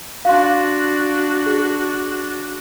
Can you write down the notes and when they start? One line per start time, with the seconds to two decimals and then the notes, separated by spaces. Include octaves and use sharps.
0.25 D4 F#4 F5 C6
1.46 G#4